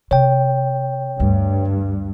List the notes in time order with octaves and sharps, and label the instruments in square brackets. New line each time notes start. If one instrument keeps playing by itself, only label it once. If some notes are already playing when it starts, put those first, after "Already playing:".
[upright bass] C3 [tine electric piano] C#5 G5
[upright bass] D2 [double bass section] G2